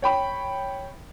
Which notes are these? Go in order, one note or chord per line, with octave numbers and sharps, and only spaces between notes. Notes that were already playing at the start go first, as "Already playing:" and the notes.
C#5 G5 B5